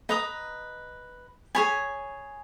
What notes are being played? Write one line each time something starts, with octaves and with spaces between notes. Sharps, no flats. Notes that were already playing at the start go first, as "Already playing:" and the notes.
B4 D#5 A#5 D#6
G#4 C#5 G#5 B5